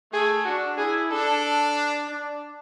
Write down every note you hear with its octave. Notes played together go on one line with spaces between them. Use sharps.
A3 G#4
D4 F#4
E4 G#4
D4 A4
D4